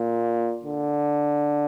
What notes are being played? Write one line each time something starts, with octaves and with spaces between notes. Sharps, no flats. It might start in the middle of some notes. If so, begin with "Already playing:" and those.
Already playing: A#2
D3